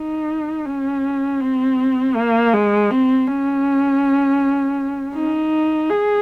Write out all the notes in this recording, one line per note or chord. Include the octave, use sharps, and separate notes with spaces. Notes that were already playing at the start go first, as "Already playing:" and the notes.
Already playing: D#4
C#4
C4
A#3
G#3
C4
C#4
D#4
G#4